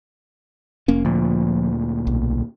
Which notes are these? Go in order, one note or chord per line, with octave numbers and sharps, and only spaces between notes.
F1 A#3 C#4
D2 A#2 F3
B1